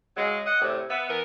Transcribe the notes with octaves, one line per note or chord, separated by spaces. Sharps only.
C#3 F#3 G#3
D#5 F#5
E2 A2 C3
B3 E5
E3 B3 A#4 B4